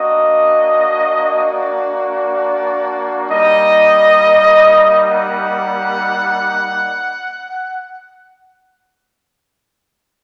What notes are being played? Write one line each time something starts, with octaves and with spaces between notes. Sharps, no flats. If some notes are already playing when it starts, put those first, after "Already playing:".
Already playing: A#3 D4 F#4 D#5
D5
G3 A#3 D#4 D#5
F#5